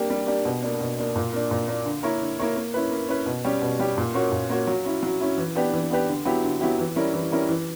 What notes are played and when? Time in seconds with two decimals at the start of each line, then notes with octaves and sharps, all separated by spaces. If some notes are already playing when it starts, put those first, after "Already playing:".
Already playing: G3 A#3 D4 G4
0.10 G3
0.27 A#3 D4 G4
0.45 B2
0.63 A#3 D4
0.81 B2
0.98 A#3 D4
1.16 A#2
1.33 A#3 D4
1.51 A#2
1.68 A#3 D4
1.85 D3
2.03 A#3 E4 A#4 C#5
2.22 D3
2.39 A#3 E4 A#4 C#5
2.56 A#3
2.74 C#4 E4 B4
2.91 A#3
3.09 C#4 E4 B4
3.26 B2
3.44 G3 C#4 G4
3.62 B2
3.79 G3 C#4 G4
3.98 A#2
4.14 A#3 C#4 F#4 C#5
4.32 A#2
4.49 A#3 C#4 F#4 C#5
4.67 F#3
4.85 C#4 E4
5.03 F#3
5.21 C#4 E4
5.38 E3
5.56 B3 D4 G4 B4
5.74 E3
5.90 B3 D4 G4 B4
6.08 D3
6.25 F#3 B3 E4 G4
6.44 D3
6.61 F#3 B3 E4 G4
6.79 E3
6.96 G3 C#4 E4 A#4
7.14 E3
7.32 G3 C#4 E4 A#4
7.49 E3